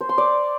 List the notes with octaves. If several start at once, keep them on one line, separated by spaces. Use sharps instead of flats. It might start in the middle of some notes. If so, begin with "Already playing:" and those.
C5
C6
D5